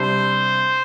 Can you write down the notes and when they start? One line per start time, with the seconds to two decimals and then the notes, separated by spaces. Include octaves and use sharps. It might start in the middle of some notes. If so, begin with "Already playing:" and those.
Already playing: C3 G3 D4 C5